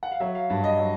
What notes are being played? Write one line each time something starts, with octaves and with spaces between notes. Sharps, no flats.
F#5
F5
F#3 E5
F5
G2
D#5
F#3